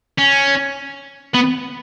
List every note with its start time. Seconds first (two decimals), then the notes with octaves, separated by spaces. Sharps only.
0.19 C#4
1.34 B3